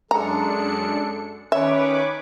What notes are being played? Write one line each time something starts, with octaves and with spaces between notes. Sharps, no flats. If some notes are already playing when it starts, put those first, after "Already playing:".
F#2 G#3 D4 A4 A#5 C#7
D#3 C#4 B4 C#5 E5 D6